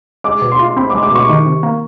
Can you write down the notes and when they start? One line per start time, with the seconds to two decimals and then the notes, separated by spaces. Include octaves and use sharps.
0.24 G#3 D6
0.42 B2
0.52 C6
0.59 F4
0.77 C4 B5
0.90 D6
0.95 G#3
1.03 D6
1.11 B2 C#6
1.30 D#3
1.46 C3
1.63 A#3